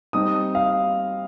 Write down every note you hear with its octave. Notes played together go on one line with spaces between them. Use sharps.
G3 C4 D#4 D#6
F5